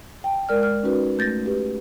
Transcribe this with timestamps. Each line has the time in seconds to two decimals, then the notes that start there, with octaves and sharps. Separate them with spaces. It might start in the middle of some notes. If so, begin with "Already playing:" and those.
0.24 G5 A5
0.49 G#3 A#4 D5 F6
0.63 F6
0.83 C#4 D#4 F#4 B4
1.18 A3 G6 A6 A#6
1.46 G4 B4